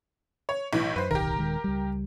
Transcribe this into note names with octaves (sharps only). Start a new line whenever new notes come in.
C#5
B1 A2 E3
F#2 B4 C5
D1 B1 D#3 G4 A#4
D#1 D#3 G#3
C#2 G3